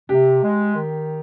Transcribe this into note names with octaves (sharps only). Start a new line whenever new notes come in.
C3 G4
G#3
D#3